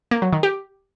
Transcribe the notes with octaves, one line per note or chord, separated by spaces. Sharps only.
A#3
F#3
D#3
G4